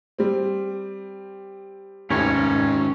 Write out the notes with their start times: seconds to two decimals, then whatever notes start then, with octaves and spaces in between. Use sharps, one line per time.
0.18 G3 C4
2.10 F1 D#2 G#2 D#3 A3 C#4 C#5